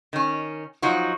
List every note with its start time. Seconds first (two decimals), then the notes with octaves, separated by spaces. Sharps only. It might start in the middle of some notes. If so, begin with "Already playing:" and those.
0.13 D#3 C#4
0.82 F3 F#3 D#4 F#4